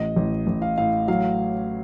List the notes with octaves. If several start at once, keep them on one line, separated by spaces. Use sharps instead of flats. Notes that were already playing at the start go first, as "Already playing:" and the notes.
Already playing: A1 D#5
A1
A1
F5
A2 F5
F#3 F5